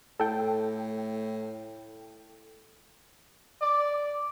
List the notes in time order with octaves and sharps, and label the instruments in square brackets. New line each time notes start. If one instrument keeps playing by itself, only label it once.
[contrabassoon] A2 [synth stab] A4 G5
[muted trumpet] D5